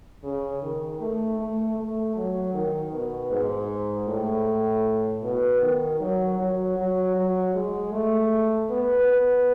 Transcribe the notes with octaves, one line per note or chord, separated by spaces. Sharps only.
C#3
D#3
A3
A3
A3
F#3
D#3
B2
G#2
A2
B2
D#3
F#3
F#3
F#3
F#3
G#3
A3
B3
B3